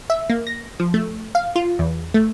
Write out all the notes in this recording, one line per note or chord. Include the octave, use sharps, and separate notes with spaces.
E5
A#3
A#6
F3
A3
F5
F4
E2
A3